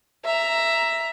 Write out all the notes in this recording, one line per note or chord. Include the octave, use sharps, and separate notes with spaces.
E5 A#5